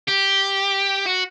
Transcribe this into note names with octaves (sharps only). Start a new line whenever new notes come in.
G4
F#4